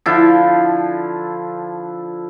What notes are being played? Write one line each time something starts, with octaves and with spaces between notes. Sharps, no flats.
D3 F3 E4 F4